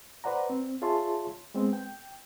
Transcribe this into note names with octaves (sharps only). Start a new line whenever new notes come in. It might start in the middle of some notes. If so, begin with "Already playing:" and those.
B4 C5 D5 F#5 A#5
C4
F4 G#4 C#5 E5 A5 C6
G#3 B3 C4
G5